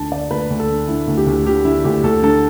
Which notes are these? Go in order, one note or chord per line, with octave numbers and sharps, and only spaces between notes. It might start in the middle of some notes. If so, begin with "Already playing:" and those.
Already playing: D2 D3 A5
D3 D5
D2 B4
D2
A4
D3
D3 E4
D2
G4
D2
D3 G4
D3 E4
D2 G4
D2 A4
D3 A4